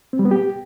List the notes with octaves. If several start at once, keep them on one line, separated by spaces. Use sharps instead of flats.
C4
G3
B3
G4